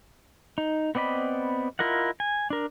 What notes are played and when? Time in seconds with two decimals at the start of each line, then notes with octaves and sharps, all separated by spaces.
0.58 D#4
0.95 B3 C4 D5 D#5 B5
1.79 E4 F4 A#4 D#5 F#5
2.20 G#5
2.50 D4 A#4